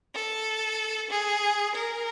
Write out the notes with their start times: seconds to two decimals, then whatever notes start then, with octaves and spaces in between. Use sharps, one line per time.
0.15 A4
1.10 G#4
1.75 A#4